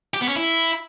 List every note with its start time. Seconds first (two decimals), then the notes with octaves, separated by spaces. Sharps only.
0.14 G4
0.21 B3
0.28 C#4
0.36 E4